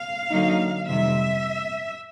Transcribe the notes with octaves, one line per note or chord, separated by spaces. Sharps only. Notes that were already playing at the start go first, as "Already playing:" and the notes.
Already playing: F5
D3 F#3 A#3 D#4
F2 C3 D#3 G3 E5